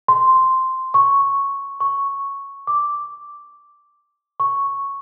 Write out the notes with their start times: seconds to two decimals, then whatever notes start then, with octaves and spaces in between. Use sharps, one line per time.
0.08 C6
0.94 C#6
1.80 C#6
2.67 D6
4.40 C#6